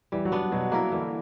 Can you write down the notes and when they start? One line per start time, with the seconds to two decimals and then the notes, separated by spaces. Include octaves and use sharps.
0.12 E3 G3
0.25 F#3
0.32 B3 D4
0.39 F#3
0.52 B2 F#3
0.72 A#3 E4 A#4
0.91 D3 E3